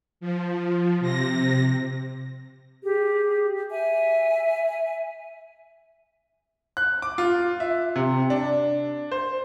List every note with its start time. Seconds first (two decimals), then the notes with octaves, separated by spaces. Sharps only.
0.20 F3
1.00 C3 A#6
2.82 G4 G#4
3.73 E5 G#5
6.77 F#6
7.02 D6
7.18 F4
7.60 E5
7.96 C3
8.30 D4
9.11 C5